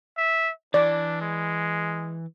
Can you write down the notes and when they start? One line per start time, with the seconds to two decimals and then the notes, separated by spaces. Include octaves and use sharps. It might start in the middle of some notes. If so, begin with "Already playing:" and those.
0.17 E5
0.74 E3 D4 D5
1.21 G#3